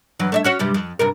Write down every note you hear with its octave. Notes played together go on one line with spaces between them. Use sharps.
G2 E3 F#3
A3 D5 E5
C#4 F#4 C#5
G2 C3 G3
F2
G2 C3 A#4